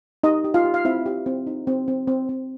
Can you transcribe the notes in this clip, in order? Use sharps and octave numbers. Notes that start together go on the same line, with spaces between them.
D#4 G4 D#5
G4
F4 F5
G4
F5
C4 E4 E5
G4
C4
D#4
C4
C4
C4
C4